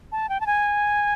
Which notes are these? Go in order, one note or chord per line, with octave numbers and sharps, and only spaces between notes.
A5
G5
A5
G#5